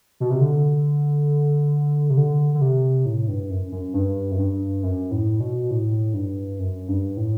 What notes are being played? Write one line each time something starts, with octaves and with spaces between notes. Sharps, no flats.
B2
C3
D3
C3
D3
D3
C3
A2
G2
F#2
F#2
G2
F#2
G2
F#2
A2
B2
A2
G2
F#2
G2
A2